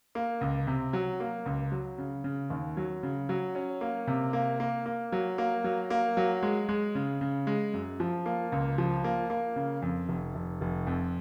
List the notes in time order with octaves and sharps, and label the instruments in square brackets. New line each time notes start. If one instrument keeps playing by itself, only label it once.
[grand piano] A#3
C#2
C3
F#3
A#3
C#2
F#3
C#3
C#3
D#2
F#3
C#3
F#3
C#4
A#3
C3
A#3
A#3
A#3
F#3
A#3
F#3
A#3
F#3
G#3
G#3
C#3
C#3
G#3
F#2
F3
A#3
C#2
F3
A#3
A#3
C#3
F2
F1
F1
F1
F2